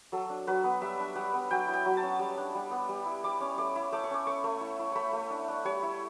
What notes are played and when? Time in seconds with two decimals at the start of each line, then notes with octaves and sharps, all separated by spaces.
0.12 F#3 A4
0.30 D4
0.47 F#3 B4
0.64 B3
0.81 G3 E5
0.99 D4
1.16 G3 F#5
1.33 B3
1.51 F#3 G5
1.67 E4
1.74 G5
1.85 F#3
1.97 A5
2.03 C#4
2.19 G3
2.37 D4
2.55 G3
2.71 B3
2.89 G3
3.06 E4
3.24 G3 D6
3.41 C#4
3.58 A3 D6
3.76 E4
3.92 A3 D6
4.04 C#6
4.10 C#4 D6
4.27 A3 C#6
4.44 A3
4.61 E4
4.79 E4
4.92 A3 B5 C#6
5.13 A3
5.30 D4
5.48 D4
5.65 G3 C#5
5.83 E4